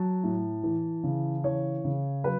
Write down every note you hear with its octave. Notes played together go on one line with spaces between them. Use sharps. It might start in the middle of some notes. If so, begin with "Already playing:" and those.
Already playing: F#3 A5
A2
E3
C#3
E3 C#5
C#3
F#3 B4